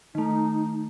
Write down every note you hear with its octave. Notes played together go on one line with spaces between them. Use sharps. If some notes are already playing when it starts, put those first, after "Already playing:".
D#3 A3 D#4